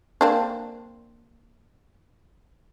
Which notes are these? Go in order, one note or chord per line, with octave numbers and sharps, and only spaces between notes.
A#3 C4 D4